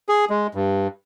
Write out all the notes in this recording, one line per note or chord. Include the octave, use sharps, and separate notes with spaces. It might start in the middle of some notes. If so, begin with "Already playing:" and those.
G#4
G#3
G2